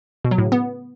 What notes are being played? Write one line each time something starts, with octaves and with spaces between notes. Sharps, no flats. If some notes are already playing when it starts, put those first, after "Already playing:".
B2
F#3
A2
C#3
B3